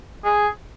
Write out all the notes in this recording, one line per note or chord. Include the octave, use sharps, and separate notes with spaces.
G#4